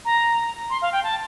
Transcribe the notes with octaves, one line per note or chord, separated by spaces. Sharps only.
A#5
C6
F5
G5
A5